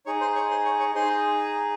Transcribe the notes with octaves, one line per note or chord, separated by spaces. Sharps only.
D#4 G#4 C#5 C#6
C5 C6
C#5 C#6
C5 C6
C#5 C#6
C#5 C#6
D#4 G#4 C5 C6